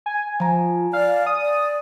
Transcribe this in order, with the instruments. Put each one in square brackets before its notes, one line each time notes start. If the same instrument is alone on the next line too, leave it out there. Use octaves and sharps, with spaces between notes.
[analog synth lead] G#5
[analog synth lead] F3 [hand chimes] G#5 A#5
[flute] D5 [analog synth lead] F5
[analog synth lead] D#6
[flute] D5